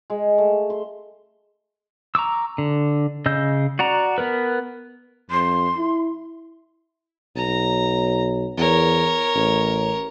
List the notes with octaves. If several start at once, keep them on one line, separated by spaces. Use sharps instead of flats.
G#3
A3
C6
A#5 C#6 D6 E6
D3
C#3 D#5 E6 G6
F#4 D5 F#5 A#5
B3 A#4 B4
F2 C6
E4
B1 A#5
E2 A#4 C#5
A1